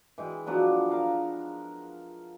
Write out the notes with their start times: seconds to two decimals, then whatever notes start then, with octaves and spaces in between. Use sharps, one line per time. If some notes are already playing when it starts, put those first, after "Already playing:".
0.18 E3 G#3 G5
0.46 F3 F#3 B3 D4
0.90 A#4 F5 A#5